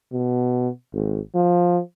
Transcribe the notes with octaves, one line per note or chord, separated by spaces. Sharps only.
B2
G#1
F3